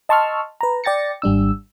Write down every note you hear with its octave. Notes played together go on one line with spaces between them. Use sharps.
D#5 A5 C6 C#6 E6 F6
B4 A#5
D5 G5 A6 A#6 C#7
G#1 G3 D4 E6